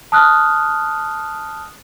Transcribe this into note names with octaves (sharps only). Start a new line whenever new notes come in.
A5 D#6 F6 F#6